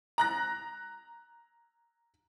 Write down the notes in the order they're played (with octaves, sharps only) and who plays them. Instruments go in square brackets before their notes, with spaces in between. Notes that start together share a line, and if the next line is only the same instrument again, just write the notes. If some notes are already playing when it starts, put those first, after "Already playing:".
[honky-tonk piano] A#5 F#6 A#6